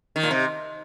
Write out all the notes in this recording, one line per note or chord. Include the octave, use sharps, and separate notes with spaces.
D#3
A#2
C3